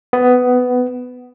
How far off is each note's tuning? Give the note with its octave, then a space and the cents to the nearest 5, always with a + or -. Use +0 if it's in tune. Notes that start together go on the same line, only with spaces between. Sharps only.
B3 +15